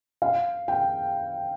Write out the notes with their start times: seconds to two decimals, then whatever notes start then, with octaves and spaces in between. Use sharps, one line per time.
0.22 F5
0.68 G5